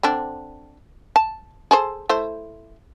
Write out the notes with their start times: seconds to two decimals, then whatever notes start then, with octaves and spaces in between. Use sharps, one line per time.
0.03 D3 C4 D4
1.16 A5
1.71 G#4 A4 C5
2.09 A3 E4 C5